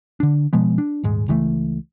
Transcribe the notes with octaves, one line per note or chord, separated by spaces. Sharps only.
D3 D4
B2 F3 G#3 B3
D4
D#1 G#2 G#3
C#2 E3 G3 A3